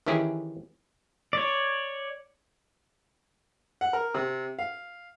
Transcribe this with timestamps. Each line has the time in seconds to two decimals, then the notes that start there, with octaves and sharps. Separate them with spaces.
0.06 D#3 E3 C#4 E4 G4 G#4
1.33 C#5 D5
3.81 F#5
3.93 A#4
4.14 C3
4.59 F5